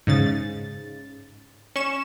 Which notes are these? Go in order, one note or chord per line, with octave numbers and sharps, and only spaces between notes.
G#2 C#3 A6
C#4 C#6 E7